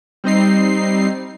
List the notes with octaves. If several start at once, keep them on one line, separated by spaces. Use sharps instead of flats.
G3 C4 D#4 C7